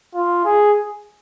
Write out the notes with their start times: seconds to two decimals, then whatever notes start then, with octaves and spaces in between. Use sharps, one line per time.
0.15 F4
0.45 G#4